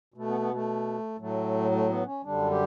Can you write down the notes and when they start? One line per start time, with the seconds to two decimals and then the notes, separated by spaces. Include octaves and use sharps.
0.14 B2 A3
0.28 B3
0.40 B3
0.54 A3
1.19 A2 F#3 A3
1.71 A3
1.88 B3
2.06 C#4
2.24 F#2 D3 G3 D4
2.50 G4